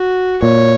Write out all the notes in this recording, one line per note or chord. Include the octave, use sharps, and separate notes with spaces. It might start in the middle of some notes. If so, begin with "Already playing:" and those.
Already playing: F#4
A#2 C#5